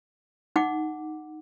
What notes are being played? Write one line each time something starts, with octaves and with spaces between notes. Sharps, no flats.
D#4 F#5 D6